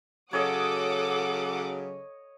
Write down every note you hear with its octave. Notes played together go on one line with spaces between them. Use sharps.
C#3 F#3 A4 C#5 D#5 F#5 D6 D#6